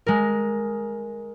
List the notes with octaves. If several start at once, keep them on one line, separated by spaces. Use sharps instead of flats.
G#3 A#4